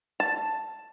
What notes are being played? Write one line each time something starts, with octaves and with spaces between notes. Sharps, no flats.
A5